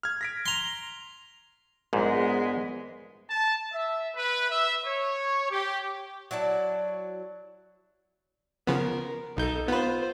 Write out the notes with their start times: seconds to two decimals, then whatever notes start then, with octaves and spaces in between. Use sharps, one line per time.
0.03 F6 G#6
0.21 A#6 B6 D7
0.46 A#5 C6
1.93 A#1 G#2 G#3 B3
3.30 A5
3.72 E5
4.15 B4
4.50 E5
4.85 C#5
5.50 G4
6.31 F#3 E4 D5 A5
8.67 C#3 F3 B3 A#4
9.37 B1 D#4 A4 G6
9.68 B3 F4 B4 C5